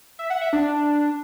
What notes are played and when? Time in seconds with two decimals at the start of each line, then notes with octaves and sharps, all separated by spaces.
0.19 E5
0.30 F#5
0.41 E5
0.53 D4